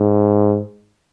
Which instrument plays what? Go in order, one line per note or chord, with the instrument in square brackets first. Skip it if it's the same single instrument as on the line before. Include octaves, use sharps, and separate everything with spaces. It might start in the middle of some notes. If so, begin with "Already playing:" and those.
Already playing: [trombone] G#2